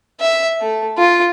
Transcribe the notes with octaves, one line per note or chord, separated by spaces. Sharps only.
E5
A3
F4